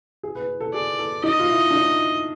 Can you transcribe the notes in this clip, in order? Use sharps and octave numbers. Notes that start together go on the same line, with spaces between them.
G#4
B4
A4
G#4 D5
A4
D#4 D#5
F4
E4
D4
D#4